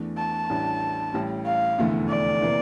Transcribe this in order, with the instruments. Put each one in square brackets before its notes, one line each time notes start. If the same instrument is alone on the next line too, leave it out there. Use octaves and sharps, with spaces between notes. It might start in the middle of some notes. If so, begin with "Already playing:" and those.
Already playing: [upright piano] E2 E3 A3 D4
[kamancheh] A5
[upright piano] A1 A2 E3 G3 D4
A1 A2 G3
[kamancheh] F5
[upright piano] F1 E2 D3 A3 E4
[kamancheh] D5
[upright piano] C3 E3 A#3